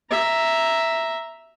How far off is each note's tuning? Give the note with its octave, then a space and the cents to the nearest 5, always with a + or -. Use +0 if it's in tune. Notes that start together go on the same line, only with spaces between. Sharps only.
E5 +0 A#5 +0